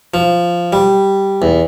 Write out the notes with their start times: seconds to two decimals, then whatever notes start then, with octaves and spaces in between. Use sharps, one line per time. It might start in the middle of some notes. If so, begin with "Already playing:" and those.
0.14 F3
0.73 G3
1.42 E2